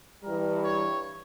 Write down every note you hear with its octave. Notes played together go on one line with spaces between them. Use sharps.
G2 E3 G3 A#4
C#5